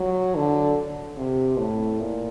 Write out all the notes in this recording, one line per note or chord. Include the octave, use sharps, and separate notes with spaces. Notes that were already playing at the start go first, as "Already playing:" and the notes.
Already playing: F#3
D3
C3
A2
A#2